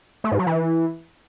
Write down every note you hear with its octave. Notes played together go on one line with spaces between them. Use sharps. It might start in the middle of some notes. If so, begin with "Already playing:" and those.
A3
G#2
F#3
E3